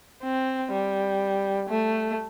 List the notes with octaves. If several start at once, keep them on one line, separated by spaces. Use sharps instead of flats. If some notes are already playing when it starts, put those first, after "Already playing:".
C4
G3
A3